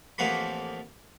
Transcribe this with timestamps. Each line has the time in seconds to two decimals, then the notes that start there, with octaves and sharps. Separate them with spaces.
0.18 A1 F2 F3 A#3 F#4 B5